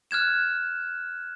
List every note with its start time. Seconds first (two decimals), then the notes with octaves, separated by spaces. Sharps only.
0.11 F6 F#6 G#6 E7